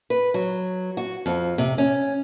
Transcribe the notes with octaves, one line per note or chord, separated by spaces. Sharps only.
B4
F#3
F#4
F2
C3
C#4